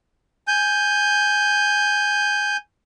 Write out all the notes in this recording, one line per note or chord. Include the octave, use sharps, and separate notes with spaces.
G#5 G6